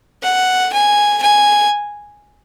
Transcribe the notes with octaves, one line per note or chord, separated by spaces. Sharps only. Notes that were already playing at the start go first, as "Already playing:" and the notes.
F#5
G#5
G#5